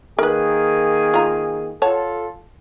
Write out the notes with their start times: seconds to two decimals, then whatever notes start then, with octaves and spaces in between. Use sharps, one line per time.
0.19 D#3 A#3 G#4 A#4 B4
1.14 F4 A#5
1.82 F4 A4 C#5 F#5 A5